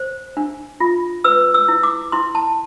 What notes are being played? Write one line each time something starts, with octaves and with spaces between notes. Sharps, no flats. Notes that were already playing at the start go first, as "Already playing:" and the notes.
Already playing: C5
D4
F4
B4 E6
E6
E4
D6
E4 C6
A5